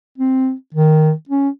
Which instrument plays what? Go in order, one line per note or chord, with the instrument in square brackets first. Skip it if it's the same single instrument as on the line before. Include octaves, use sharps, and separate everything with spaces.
[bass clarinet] C4
D#3
C#4